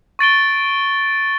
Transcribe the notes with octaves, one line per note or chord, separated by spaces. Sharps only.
C#6 A6 D7 G7